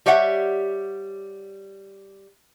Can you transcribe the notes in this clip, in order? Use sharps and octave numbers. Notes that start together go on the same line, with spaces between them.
G3 G4 C#5 E5 F#5